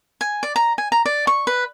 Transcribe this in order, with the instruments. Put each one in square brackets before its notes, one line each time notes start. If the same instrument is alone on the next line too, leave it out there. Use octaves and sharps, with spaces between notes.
[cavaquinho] G#5
D5
A#5
G#5
A#5
D5
C#6
B4